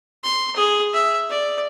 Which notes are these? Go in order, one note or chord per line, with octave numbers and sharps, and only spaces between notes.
C6
G#4
E5
D5